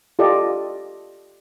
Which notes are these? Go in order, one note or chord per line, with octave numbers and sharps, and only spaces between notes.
F4 G4 A4 D5 D#5